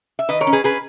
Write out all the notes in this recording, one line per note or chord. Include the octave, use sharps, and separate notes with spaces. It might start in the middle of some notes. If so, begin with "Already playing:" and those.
E5
D#3 B4 D#5
A#4 C#5
C#4
G#4 B4
C#4 G#4 B4